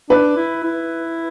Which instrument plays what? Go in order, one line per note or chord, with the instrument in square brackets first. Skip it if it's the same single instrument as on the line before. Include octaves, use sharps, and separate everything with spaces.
[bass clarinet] D4 [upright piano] B4
[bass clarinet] E4
E4